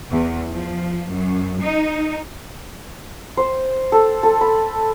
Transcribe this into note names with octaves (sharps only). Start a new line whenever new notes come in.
E2
F3
F#2
D#4
C5
A4
A4
B5